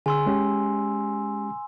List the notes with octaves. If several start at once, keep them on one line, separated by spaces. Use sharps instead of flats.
D3 G#4 G#5 C6 E6
G#3 C#4 G4